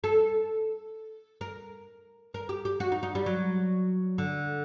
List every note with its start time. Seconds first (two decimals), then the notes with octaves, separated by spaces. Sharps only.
0.04 A4
1.41 A#4
2.34 A#4
2.49 G4
2.65 G4
2.80 F#4
2.92 D#4
3.03 D#4
3.15 G3
3.26 F#3
4.18 D3